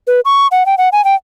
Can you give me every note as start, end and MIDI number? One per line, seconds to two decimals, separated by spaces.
0.07 0.20 71
0.25 0.47 85
0.52 0.66 78
0.66 0.75 79
0.78 0.89 78
0.92 1.04 80
1.05 1.15 79